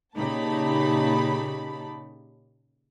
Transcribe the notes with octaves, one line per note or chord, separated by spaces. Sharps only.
A#2 C#3 D#4 G4 A5 B5